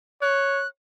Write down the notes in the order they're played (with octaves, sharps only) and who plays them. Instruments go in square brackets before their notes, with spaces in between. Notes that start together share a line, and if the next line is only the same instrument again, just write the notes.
[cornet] C#5 [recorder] F#6